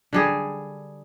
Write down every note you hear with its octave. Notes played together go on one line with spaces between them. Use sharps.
D3 G3 G#4